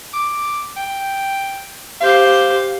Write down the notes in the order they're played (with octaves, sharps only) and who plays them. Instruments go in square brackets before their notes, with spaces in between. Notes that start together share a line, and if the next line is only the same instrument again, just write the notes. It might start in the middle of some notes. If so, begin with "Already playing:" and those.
[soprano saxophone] D6
G5
[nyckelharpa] G4 C5 [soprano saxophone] F5